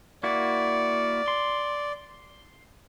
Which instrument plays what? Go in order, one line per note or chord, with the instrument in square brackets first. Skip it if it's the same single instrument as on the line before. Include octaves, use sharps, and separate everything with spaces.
[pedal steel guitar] A#3 E4 F#4 [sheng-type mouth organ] D5
[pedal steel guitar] C6